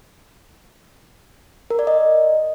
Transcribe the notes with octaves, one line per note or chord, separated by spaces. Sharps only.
A#4
D5
D#5